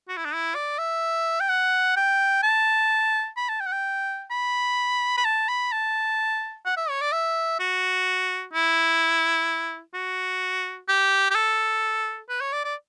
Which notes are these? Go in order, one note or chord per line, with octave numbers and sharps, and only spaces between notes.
F#4
E4
D4
E4
D5
E5
G5
F#5
G5
A5
B5
A5
G5
F#5
G5
B5
B5
A5
B5
A5
F#5
E5
C#5
D5
E5
F#4
E4
F#4
G4
G4
A4
B4
C#5
D5
D5